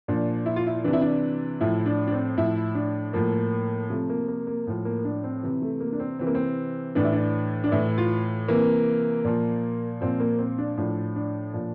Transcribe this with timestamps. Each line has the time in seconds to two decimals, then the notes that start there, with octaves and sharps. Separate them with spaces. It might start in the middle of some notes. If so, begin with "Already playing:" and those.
0.08 A#2 F3 D4
0.46 E4
0.56 F4
0.67 E4
0.84 C3 E3 D4
0.93 E4
1.01 D4
1.61 A2 F3 E4
1.86 D4
2.07 D4
2.12 C4
2.37 A2 F3 E4
2.75 D4
3.13 A2 F3 A#3
3.90 C3 F3 A3
4.10 A#3
4.28 A#3
4.47 A#3
4.67 A2 F3
4.85 A#3
5.05 D4
5.24 C4
5.43 C3 E3
5.62 A3
5.80 A#3
5.92 D4
6.00 C4
6.19 C3 E3 C4
6.27 A#3
6.35 C4
6.95 A2 E3 D4
7.04 E4
7.12 D4
7.64 D4
7.72 A2 E3 E4
7.98 F4
8.48 C3 E3 A#3
9.25 A#2 F3
10.01 A#2 F3 C4
10.20 A#3
10.39 C4
10.58 D4
10.77 A2 F3 D4
11.16 D4
11.54 A#2 F3